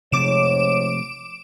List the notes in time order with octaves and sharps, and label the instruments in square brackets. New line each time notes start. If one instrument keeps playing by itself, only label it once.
[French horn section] G#2 C#5 [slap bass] C3 F3 A3 [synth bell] D6 D7 E7